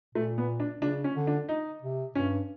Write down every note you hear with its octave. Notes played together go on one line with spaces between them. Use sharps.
A#2 A3
B3
D4
C#3 D4
C#4
D3
D4
D#4
C3
G2 C#4